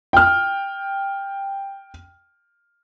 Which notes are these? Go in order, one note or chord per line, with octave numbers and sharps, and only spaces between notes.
G5 F6